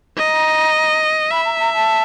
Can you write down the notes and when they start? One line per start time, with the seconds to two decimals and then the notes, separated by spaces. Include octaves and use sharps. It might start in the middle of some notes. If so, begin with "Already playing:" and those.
0.18 D#5 A#5
1.31 E5 B5
1.45 A#5
1.59 A#5
1.73 A5